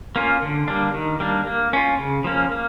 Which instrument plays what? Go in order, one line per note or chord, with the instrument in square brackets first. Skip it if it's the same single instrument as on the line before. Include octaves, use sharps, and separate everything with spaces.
[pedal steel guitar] A#3 C#4 F4
D3
G3 A#3 D4
D#3
G3 A#3 D4
A#3
C#4 F4
C#3
F3 A#3 C#4
A#3